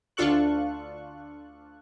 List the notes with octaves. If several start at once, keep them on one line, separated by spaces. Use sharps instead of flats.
D2 D4 F4 A4 C#6 F#6